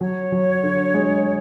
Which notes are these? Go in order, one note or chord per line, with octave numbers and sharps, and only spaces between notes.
F#3 C#5
F#3
D3
G#3